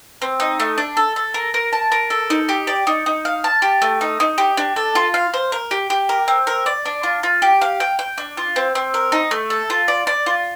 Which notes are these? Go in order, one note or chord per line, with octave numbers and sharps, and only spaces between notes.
C4
D#4
A3
D4
A4
A4
A#4
A#4
A5
A#4
A4
D#4
G4
D5
D#4
D#4
F5
A5
G4
A3
D#4
D#4
G4
D4
A4
F4
F5
C5
A#4
G4
G4
A#4
C4
A#4
D5
D4
F4
F4
G4
F5
G5
G5
D4
F4
C4
C4
A#4
D#4
A3
A4
F4
D5
D5
F4